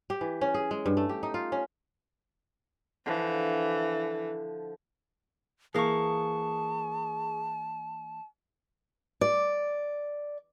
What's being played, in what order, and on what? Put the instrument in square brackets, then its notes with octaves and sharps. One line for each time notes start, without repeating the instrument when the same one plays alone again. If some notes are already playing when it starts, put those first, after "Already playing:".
[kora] G4
E3
C#4
G#4
G#3
G2
A3
G4
D#4
F4
C#4
[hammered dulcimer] D3 F3 [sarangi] E3
[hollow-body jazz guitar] E3 A#3 [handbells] G#4 C#6 [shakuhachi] A5
[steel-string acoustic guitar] D5